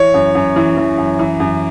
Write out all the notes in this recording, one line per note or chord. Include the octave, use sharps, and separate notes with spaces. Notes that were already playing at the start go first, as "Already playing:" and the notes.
Already playing: E3 C#5
F#2
F#2
E3
E3
F#2
E3
F#2